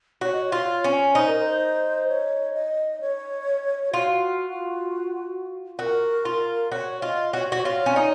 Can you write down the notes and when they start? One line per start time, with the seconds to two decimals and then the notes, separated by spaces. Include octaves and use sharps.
0.21 F#4 C#5
0.33 D#5
0.45 C#5
0.52 F4
0.84 C#4
1.15 D#4 C5
1.27 A#4
1.39 C5
2.08 C#5
2.54 D#5
3.01 C#5
3.93 F4 F#4
5.79 F#4 A#4
6.25 F4
6.71 F#4 C#5
7.02 F4 D#5
7.33 F#4 C#5
7.52 F#4
7.65 F4 C#5
7.86 C#4
7.96 D#4